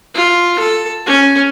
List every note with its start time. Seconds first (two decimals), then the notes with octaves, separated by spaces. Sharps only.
0.15 F4
0.59 A4
1.06 C#4